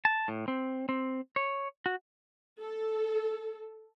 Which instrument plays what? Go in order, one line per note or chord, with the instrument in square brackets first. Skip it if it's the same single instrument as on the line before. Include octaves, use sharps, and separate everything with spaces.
[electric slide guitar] A5
A2
C4
C4
C#5
F#4
[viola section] A4